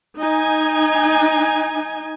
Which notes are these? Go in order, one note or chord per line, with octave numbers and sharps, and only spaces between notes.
D#4 G#5